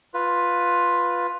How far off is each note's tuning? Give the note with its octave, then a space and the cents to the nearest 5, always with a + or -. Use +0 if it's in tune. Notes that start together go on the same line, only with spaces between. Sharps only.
F4 +10 B4 +0